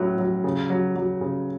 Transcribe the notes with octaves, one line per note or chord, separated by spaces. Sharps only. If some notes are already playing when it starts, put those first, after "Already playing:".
Already playing: A2 F#3 C#4
F#3
C#3
F#3
F#3
C#3